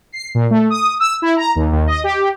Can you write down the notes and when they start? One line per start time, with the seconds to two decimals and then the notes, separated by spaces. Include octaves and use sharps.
0.13 C7
0.35 A#2
0.51 A3
0.70 D#6
1.00 E6
1.22 E4
1.37 A#5
1.55 D#2
1.72 D#2
1.87 D#5
2.04 G4